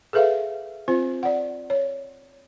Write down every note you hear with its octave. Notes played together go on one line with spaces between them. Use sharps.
G#4 A4 B4 E5 F5
C4 F4 C5
D5 F#5
C#5